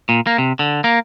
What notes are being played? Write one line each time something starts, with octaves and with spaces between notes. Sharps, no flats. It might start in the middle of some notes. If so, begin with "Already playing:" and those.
A#2
A#3
C3
D3
A#3